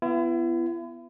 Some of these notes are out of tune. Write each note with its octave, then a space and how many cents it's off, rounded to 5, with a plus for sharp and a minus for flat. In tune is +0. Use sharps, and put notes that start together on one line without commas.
B3 +10 E4 +40